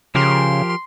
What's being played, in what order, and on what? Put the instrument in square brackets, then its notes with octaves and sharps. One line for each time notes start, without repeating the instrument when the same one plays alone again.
[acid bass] C#3 [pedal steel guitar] F3 G4 A#4 [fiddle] C6